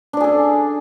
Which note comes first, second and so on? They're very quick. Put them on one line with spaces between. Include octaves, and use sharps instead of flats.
D4 D5 G#4 A4